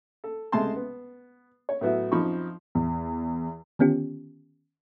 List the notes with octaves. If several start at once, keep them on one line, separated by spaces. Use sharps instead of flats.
A4
C#2 C3 G#3 A3 A5 C6
B3
C#5
A2 F#3 B3 E4 F#4
F#2 F3 C4 D#4 B5 C#6
E2
D3 D#3 B3 C#4 F4 G4